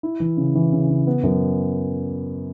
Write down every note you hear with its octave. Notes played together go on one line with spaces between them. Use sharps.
E4
E3
C#3
E3
C#3
C#3
B3
F#2